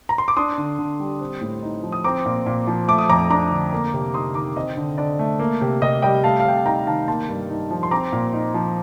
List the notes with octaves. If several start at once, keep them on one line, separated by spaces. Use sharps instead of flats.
A#5
C6
D6
D4 C6 D#6
D3
D3
G3
C4
A2
D#4
F3
D#6
C4 A#5 D6
A#2
A#2
F3
A3 D6
D#6
F2 A#5 D6
D4 A#5 D6
D3
A#3
C3
D#4 C6 D#6
D#3 A#5 D6
C4 D#5
D3
D3 D5
A3
A#3
C3
C3 D#5
G3 D#5 G5
A3 F5 A5
F5
C3 G5
A5
D#4 G5 A#5
D#3 F5 A5
A#3 A5 C6
G2
D#4
F3
C6
C4 A#5 D6
A#2
D#4
F3